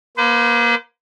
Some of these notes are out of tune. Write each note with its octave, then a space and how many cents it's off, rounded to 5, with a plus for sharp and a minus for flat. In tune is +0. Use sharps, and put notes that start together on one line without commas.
A#3 +25 C5 -45